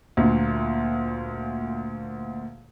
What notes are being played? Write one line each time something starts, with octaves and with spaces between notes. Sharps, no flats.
D2 A#2